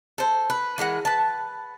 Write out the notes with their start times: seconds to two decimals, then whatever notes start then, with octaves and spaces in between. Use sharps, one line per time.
0.18 A4 C5
0.50 B4
0.78 E3 G#3 A#4 F#5
1.05 B4 A5